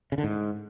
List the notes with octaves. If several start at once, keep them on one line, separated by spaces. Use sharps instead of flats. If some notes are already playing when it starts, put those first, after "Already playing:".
C#3
D3
G#2